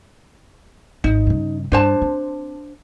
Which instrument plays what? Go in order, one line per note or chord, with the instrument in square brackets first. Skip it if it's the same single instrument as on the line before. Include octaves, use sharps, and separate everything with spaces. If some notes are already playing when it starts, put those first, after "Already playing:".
[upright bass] G#1 [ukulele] D#4
[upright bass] G2 C#3
[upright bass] G2 [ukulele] D4 C5 A5
[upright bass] C4